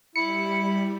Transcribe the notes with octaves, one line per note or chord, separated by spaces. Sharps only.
G3 E4 B5 C#7